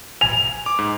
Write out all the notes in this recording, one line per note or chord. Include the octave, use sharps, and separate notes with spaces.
G#5 F7
D6
G#2